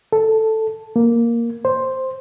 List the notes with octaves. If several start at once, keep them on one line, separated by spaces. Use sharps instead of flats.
A4
A#3
C5